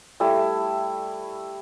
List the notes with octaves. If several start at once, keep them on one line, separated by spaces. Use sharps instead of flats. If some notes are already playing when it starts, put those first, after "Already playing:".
G3 A3 E4 A5